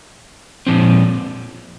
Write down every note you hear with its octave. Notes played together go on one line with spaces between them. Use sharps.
A#2 F3 C4